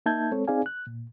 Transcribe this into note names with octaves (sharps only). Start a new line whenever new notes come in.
A#3 D#4 E5 A5 G6 G#6
G#3 C4 A4 C#5
C4 D#4 G#4 D5 F5 G#5
F#6
A#2